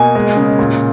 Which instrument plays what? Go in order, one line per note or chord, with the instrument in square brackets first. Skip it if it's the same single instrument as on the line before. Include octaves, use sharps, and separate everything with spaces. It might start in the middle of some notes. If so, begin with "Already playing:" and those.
Already playing: [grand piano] B2 A#3 [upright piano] G#5
[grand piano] G#3
C#3
A#2